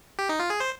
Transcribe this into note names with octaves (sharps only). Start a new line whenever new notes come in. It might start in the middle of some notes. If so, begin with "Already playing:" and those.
G4
D#4
F4
G#4
C5